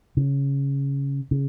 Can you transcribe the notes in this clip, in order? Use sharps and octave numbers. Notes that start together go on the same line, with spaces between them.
C#3
C#3